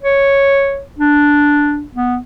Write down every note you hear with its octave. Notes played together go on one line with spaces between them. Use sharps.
C#5
D4
B3